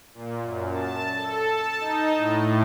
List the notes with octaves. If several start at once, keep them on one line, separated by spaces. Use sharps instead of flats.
A#2
F#2
A5
A4
A5
D#4
A2